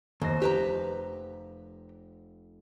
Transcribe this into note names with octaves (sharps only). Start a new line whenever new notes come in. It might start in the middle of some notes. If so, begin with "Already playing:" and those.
F1 D#2 C5 A#6
G4 B4 A#5